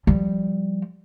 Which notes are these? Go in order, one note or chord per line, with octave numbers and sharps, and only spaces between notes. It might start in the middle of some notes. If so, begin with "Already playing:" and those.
F3 G3